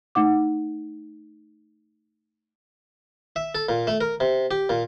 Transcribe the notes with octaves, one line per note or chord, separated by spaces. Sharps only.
A3 D#4 F#5 D6
E5
A4
A#2
A3
A#4
C3
G4
A#2